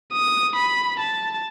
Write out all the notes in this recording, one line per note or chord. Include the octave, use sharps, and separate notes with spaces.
D#6
B5
A5